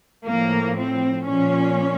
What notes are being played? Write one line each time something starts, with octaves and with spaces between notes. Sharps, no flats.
A2 F3 A#3
C4
A#2 F3 C#4